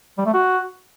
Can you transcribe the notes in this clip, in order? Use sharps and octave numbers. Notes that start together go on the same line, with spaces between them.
G3
A3
F#4